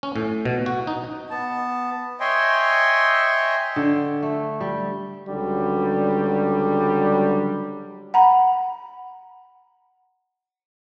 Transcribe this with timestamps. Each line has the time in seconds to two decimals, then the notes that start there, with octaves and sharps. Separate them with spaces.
0.03 C#4
0.16 A2
0.45 B2
0.66 F#4
0.87 D#4
1.30 B3 A5
2.20 C#5 D#5 E5 G5 G#5 C6
3.76 D3
4.22 A3
4.60 G3
5.29 C#2 D3 F#3 G3
8.14 F#5 A#5 B5